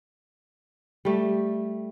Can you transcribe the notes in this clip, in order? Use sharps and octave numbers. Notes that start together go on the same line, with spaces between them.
G3 A3